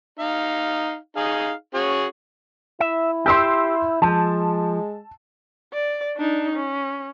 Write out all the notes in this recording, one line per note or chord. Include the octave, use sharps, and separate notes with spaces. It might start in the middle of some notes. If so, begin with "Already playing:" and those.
D#4 F5
D#4 G#4 F5
C#4 F#4 G#4
E4 E5
G4 C6 E6 G6
F3 G#3 A5
D5
D4 D#4
C#4